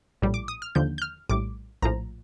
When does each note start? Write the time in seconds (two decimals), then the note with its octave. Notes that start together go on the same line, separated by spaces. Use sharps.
0.22 A#1 A2 G3
0.34 D6
0.48 D#6
0.62 F6
0.75 D#2 D3 F3 G6
0.98 G6
1.02 F6
1.30 A#1 A2 G3 D6
1.82 A#1 A2 F3 A#5